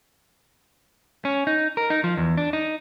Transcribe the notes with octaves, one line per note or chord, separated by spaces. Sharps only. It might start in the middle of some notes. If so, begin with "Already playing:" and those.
C#4
D#4
A#4
D#4
F3
E2
D4
D#4